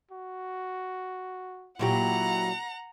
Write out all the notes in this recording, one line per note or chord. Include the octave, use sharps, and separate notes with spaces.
F#4
A#2 F#3 E4 G4 F#5 A#5